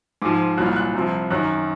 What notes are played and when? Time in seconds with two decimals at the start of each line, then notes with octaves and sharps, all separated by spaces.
0.22 G#2 F3 D6
0.57 C2 A#2 F#3 F#6
0.66 F6
0.76 F#6
0.95 C2 C3 F3
1.30 F#2 D#3 F#3 F#6